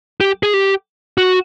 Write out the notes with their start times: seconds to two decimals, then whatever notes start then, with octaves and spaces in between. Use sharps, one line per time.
0.21 G4
0.43 G#4
0.54 G4
1.18 F#4